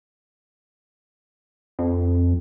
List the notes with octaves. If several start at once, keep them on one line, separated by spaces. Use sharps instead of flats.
F2